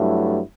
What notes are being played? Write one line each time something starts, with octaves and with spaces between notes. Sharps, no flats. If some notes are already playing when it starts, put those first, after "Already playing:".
Already playing: G2 F#3 A3 E4